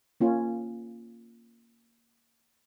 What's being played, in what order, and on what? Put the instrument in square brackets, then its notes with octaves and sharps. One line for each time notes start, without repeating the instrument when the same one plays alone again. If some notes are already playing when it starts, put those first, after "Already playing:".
[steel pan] A#3 C#4 F4